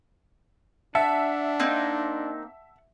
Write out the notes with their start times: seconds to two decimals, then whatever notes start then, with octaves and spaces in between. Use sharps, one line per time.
0.95 D4 E5 F#5 A5
1.60 A#3 C4 D#4